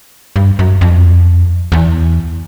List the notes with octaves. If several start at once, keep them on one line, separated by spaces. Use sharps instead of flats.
G2
F#2
F2
E2